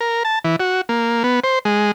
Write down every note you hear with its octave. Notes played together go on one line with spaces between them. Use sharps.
A#4
A5
E3
F#4
A#3
B3
C5
G#3